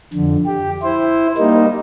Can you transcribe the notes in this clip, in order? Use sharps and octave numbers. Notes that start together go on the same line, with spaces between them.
F2 D3
G4
E4 C5
G3 A#3 D#4